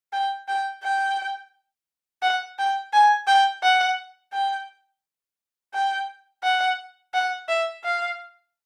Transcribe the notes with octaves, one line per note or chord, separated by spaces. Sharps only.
G5
G5
G5
F#5
G5
G#5
G5
F#5
G5
G5
F#5
F#5
E5
F5